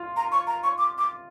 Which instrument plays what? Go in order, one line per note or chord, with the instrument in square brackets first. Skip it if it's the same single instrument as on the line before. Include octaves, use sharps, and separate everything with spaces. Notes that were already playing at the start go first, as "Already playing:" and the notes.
Already playing: [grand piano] F4
[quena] A#5
C#6
A#5
C#6
D6
D6